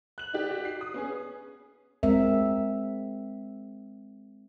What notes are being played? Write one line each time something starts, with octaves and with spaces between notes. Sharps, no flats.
F#6 F#7
D#4 G4 D5
F#4 G4
C7
D#6
B3 C#4 G#4
G#3 C4 A#4 E5